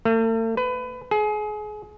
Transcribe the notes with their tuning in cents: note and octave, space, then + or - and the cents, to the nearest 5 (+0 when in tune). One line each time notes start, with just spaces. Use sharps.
A3 +45
B4 +25
G#4 +30